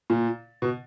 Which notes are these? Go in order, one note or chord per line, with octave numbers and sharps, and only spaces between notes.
A#2
B2